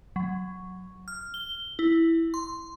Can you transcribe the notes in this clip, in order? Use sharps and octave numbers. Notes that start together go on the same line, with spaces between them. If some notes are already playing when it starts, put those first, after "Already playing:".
F#3
F6
G7
E4
C6